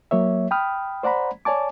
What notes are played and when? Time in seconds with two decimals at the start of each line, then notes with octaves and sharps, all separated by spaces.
0.11 F#3 A#3 C#5 E5
0.51 G5 B5 D#6 F6
1.03 C5 D5 F#5 A#5 B5
1.45 C#5 D5 G#5 A5 D6